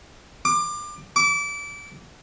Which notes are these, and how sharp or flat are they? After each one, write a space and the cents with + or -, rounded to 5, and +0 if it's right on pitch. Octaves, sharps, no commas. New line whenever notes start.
D6 +25
D6 -25